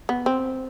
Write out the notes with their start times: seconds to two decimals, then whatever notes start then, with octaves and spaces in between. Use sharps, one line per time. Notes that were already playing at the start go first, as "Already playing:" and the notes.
0.09 B3
0.26 C4